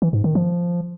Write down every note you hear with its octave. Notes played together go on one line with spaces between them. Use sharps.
E3
G#2
D#3
F3